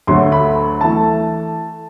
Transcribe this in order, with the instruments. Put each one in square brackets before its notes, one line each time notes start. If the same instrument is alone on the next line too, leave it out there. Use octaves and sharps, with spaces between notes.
[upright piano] D2 D3 F#3 A3 C6
B5
E3 A3 A5